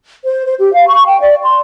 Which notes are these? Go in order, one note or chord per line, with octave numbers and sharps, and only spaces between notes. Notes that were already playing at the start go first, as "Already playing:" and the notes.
C5
C5
G4
F5
C#6
G5
D5
C6